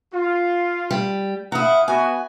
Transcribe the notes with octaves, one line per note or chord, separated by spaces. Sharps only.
F4
G3
E4 F5 F#5 A#5 D#6
B3 F#4 G#5